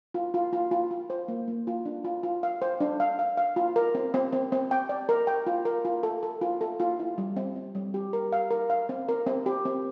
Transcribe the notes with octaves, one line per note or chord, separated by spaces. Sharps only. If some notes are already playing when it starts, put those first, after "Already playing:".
F4
F4
F4
F4
F4
C5
A#3
A#3
F4
D4
F4
F4
F5
C5
D4
F5
F5
F5
F4
A#4
C4
C4
C4
C4
G5
D5
A#4
G5
F4
A#4
F4
A4
A4
F4
A4
F4
E4
G3
C4
C4
G3
G4
A#4
F5
A#4
F5
C4
A#4
C4
G4
C4